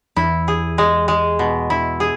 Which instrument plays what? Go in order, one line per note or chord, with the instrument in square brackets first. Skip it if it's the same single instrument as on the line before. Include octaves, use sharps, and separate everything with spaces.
[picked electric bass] E2 [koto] E4
[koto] G#4
G#3
G#3
B2
E4
G#4